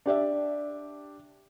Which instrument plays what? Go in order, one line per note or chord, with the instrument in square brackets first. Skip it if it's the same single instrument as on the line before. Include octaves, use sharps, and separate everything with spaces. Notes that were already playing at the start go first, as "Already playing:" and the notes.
[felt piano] D4 G4 D5 E5